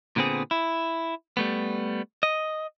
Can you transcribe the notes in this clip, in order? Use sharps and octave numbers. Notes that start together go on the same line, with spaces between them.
A#2 D3 B3 C4 G#4
E4
G3 A3 B3
D#5